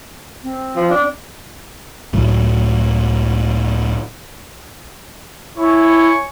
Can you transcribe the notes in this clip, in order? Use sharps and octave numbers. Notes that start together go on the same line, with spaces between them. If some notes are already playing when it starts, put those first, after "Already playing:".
C4
F3
D4
C#2 A2 F#3 A3
E4 C#5 G#5 C#6